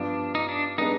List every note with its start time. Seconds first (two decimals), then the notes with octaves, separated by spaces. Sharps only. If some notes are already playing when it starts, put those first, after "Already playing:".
Already playing: G2 F3 B3 D4
0.35 D#4
0.49 D4
0.78 G3 B3 D4 D#4 G#4